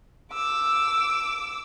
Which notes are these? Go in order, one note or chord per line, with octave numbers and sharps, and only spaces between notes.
D6 E6